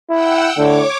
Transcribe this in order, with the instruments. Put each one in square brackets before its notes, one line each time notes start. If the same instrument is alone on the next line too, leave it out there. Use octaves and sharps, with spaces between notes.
[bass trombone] E4 [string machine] F#5 G5 E6
[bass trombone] A2 [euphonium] D3 [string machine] C#5 D6